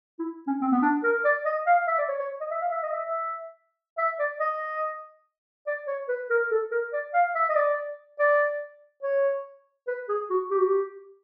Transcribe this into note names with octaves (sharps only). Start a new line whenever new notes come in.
E4
C#4
C4
B3
D4
A#4
D5
D#5
F5
E5
D5
C#5
C#5
D#5
E5
F5
E5
D#5
E5
E5
E5
D5
D#5
D5
C#5
B4
A#4
A4
A#4
D5
F5
E5
D#5
D5
D5
C#5
B4
G#4
F#4
G4
F#4
G4